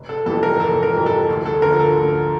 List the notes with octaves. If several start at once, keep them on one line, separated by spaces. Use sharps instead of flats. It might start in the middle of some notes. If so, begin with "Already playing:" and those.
Already playing: F1
A4
F2 E3 G3 A4
A#4
F1 A4
A#4
F2 E3 G3
A4
D2
A4
D3 F3 A#4
A4
D2